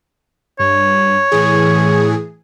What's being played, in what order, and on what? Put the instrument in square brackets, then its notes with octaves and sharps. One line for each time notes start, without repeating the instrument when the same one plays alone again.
[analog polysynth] G2 [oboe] C#5
[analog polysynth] A2 E3 G#4